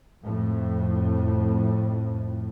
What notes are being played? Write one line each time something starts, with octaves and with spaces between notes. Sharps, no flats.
F2 A2